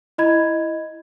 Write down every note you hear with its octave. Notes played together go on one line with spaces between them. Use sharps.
E4 D#5 B5 G#6